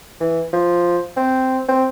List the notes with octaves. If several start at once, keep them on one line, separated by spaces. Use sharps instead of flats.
E3
F3
C4
C4